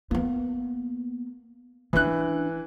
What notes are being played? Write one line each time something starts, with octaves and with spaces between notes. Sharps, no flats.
A#3 B3
E3 C#4 D4 F#6